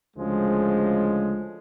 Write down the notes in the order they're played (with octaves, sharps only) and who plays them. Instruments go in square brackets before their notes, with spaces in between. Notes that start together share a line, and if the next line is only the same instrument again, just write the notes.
[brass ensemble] D2 C#3 F3 G#3